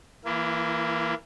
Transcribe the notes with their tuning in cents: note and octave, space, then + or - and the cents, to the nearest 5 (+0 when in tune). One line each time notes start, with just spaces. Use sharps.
E3 -5 A#3 +0 E4 +45